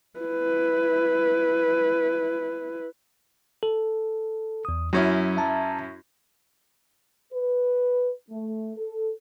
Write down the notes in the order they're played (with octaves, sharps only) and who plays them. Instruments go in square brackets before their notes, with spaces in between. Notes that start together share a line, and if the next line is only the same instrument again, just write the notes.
[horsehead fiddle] E4 B4
[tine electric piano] A4
E2 D#6
[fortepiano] F#2 C#4 E4 [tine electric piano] F#3
[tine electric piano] E5 A5 A#5
[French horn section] B4
A3
A4